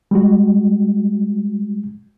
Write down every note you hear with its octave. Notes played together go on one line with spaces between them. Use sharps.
G3 G#3 F#4